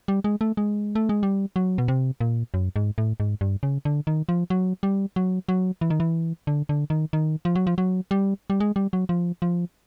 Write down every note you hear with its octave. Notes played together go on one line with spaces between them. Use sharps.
G3
G#3
A3
G#3
A3
G#3
G3
F#3
B2
C3
A#2
F#2
G#2
A2
G#2
G2
C#3
D3
D#3
F3
F#3
G3
F#3
F#3
E3
D#3
E3
D3
D3
D#3
D#3
F3
F#3
F3
F#3
G3
G3
G#3
G3
F#3
F3
F3